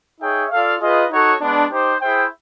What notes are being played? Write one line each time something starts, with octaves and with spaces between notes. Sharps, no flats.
D#4 G#4 C#5 E5 G5
F4 A4 D5 F5
F4 G#4 B4 D#5
D#4 F#4 A4 C#5
G#3 B3 D4
D#4 G4 C5
E4 G#4 C5 E5 G5